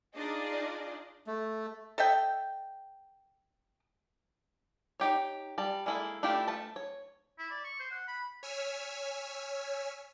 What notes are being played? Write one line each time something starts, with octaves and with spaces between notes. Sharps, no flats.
D4 D#4 F4 G#4 D5 D#5
A3
A4 D#5 E5 G5
D#4 G4 C#5
G3 A5
G#3 A#3 E4 F#4 A4
A3 D4 E4 F4 G4
A3 A5
C#5
E4
D5
C#6
C5
F#5
B5
C#5 G#5 E6 F6 B6